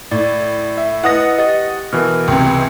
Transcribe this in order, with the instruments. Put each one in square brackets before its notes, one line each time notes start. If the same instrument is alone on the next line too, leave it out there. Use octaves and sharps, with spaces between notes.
[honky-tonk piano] A2 [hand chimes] D5 A6
[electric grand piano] E5
[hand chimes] E4 B4 D#5 [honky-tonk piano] F#5 D#6 A#6
[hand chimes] G4 A6 [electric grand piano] D#5
[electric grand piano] B2 E3 [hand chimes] A#4 F6
[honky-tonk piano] C#2 C3 [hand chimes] G5